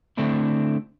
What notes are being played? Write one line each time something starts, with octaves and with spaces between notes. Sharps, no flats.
D3 A3 C4 D4 E4